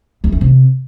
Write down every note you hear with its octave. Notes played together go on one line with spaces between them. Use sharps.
E2
E3
C3